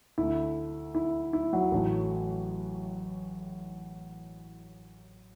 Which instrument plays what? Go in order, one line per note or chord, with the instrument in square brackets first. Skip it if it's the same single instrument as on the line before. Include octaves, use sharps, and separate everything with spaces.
[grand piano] D2 D3 A3 E4
E4
E4
F#3 F#4
A1 A2 F#3 A3